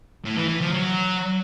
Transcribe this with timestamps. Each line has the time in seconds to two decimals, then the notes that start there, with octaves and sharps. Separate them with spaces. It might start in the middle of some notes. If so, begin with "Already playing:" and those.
0.25 A2
0.37 E3
0.49 E3
0.61 F3
0.73 F#3